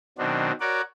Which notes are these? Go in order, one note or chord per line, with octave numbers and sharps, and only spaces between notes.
B2 D#3 F#3 C4 D4
F#4 A#4 C#5 D5 F#5 D6